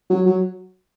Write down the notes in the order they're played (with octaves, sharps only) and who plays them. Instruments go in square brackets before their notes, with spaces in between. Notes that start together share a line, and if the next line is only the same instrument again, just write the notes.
[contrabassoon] F#3
F#3